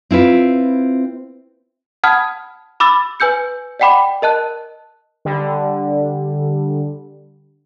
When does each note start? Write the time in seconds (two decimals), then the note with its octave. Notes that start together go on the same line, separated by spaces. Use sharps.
0.11 C4 E4 F4 B4
2.04 F#5 A5 B5 D#6 F6 G#6
2.80 B5 D6 E6 A6
3.20 B4 G#5 E6 G6 C#7
3.80 D5 D#5 F#5 G5 B5 D6
4.22 A#4 D#5 A5 F#6
5.25 D3 G3